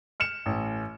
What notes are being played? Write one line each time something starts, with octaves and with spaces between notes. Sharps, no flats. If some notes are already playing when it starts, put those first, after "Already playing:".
F6 C#7 E7
A1